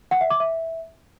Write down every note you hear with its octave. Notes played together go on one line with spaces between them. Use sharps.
F#5
E5
D6
E5